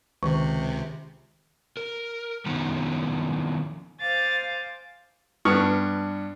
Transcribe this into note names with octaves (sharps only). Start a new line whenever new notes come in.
C#2 C3 D#3
A#4
D#3 F3 B3 C#4 D#4
C5 F5 G#5 D6 A6
G2 B3 D4 C#6 F6